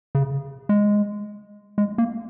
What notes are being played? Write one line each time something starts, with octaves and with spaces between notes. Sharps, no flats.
C#3
G#3
G#3
A#3